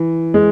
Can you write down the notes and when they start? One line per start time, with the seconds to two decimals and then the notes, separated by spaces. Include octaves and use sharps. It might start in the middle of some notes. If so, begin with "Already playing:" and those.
Already playing: E3
0.34 G#3